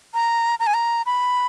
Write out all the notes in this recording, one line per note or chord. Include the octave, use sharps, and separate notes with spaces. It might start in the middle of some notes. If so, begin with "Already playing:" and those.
A#5
A#5
G#5
A#5
B5